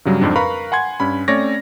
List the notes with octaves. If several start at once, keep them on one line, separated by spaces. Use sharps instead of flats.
G2 C#3 F#3 G3
F2 G#2 C4 D4
A#4 B4 F5 A#5 B5 C#6
F#5 G#5 C6 G#6
G2 C#4 B5
A3 C4 C#4 C#5 D5 A#6